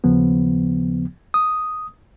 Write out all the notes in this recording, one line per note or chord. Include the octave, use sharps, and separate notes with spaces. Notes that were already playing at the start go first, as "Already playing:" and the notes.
D#2 C#3 F3 B3
D#6